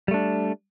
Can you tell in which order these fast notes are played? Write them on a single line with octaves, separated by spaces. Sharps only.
G3 A3 D4